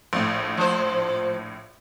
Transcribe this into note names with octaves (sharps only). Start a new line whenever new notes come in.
A#1 A2
F3 C5